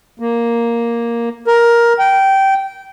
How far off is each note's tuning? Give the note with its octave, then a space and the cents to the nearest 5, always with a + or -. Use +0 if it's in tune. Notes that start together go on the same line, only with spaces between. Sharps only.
A#3 +5
A#4 +10
G5 -15